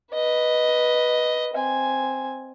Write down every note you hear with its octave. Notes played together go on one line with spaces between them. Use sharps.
B4 D#5
C4 G#5